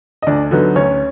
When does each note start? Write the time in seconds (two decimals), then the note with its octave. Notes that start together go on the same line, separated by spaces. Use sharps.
0.22 D#5
0.26 D2 D4 D5
0.51 D3 F#3 B3 D#4
0.76 D2 C#4 C#5